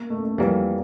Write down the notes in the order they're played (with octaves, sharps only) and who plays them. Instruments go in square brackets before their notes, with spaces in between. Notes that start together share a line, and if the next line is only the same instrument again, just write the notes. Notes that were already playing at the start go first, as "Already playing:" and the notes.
Already playing: [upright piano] A#3
A3
A3
[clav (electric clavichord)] F2 E3 G3 A#3